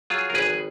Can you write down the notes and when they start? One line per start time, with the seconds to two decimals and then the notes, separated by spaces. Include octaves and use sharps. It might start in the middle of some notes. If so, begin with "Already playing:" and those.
0.10 F#3 F4 G#4
0.30 A#4
0.34 G#1 G#4 B4